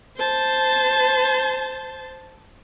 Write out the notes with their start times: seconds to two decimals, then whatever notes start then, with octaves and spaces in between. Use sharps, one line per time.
0.17 C5 A5